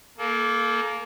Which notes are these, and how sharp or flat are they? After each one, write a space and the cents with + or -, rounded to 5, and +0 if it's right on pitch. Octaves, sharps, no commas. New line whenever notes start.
A#3 +0 A4 -40